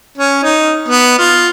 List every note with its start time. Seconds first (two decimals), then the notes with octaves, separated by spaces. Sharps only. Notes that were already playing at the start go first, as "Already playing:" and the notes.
0.18 C#4
0.43 D#4
0.88 B3
1.19 F4